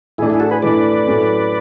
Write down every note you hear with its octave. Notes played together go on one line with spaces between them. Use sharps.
A2 E3 A3 D4 E4 G#4
E4 G#4
F#4 A4
G#4 B4
A2 E3 A3 D4 B4 D5
A2 F#3 A3 C#4